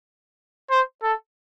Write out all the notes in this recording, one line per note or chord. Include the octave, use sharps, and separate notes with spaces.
C5
A4